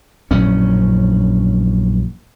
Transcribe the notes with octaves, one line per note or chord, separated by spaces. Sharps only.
A#1 F#2 A2 C#4